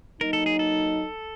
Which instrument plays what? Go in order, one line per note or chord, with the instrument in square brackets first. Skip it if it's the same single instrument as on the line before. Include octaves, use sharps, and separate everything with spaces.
[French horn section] F#3 A#3 D#4 [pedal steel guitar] A#4
[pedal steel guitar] A4
G#4
A4